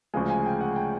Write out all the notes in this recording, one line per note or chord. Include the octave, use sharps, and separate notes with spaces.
D2 C#3 F3 G#3 G#5
G#5
G5
F#5
G5